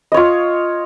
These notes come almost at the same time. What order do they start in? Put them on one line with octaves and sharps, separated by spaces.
D#5 C#5 F4